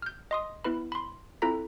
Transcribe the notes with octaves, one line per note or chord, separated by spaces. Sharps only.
F6 G6
D#5 C6 D#6
B3 E4 B4 B5
B5 C6
C4 E4 F4 A4 A#5 B6